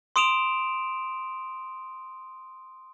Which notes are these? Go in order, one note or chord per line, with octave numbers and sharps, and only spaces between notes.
C6 D#6 D7 E7 F7